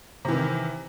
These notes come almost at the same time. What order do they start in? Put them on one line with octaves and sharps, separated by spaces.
C3 E3 D#3